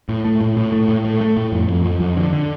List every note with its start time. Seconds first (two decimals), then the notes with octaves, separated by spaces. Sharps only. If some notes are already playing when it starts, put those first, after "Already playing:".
0.09 A2
0.24 A3
0.41 A2
0.57 A2
0.72 A3
0.89 A2
1.05 A3
1.21 A3
1.37 A2
1.52 F2
1.68 F2
1.84 F2
2.00 F2
2.17 D3
2.33 D3